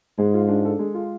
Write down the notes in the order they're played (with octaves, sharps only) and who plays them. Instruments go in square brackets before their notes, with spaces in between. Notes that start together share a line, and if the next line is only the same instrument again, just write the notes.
[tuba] G#2 [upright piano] G#3
[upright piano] F4
D4
A4
G#3
F4